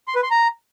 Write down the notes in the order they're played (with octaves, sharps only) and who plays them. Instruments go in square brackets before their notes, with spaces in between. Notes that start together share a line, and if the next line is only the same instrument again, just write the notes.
[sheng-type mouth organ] C6
B4
C6
A#5